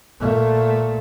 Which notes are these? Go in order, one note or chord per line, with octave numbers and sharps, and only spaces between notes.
A#2 A3